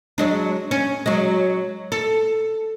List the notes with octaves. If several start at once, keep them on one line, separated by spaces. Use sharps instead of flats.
F#3 G#3 D4
C#4
F#3 G#3
A4